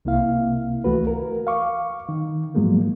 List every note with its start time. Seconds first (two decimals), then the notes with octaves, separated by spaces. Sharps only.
0.05 C2 C3 A#3 E4 F5
0.84 C#2 E3 A3 F#4 B4
1.07 A#4
1.47 F5 C#6 D6
2.09 D#3
2.54 G#2 F3 F#3 G#3 A#3 B3